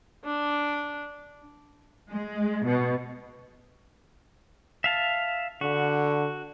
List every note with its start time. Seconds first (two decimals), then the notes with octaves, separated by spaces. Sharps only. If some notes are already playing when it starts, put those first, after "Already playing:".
0.25 D4
2.11 G#3
2.66 B2
4.84 E5 F5 A5
5.61 D3 F#4